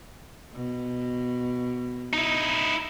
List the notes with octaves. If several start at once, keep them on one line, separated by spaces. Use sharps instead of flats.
B2
D#4 E4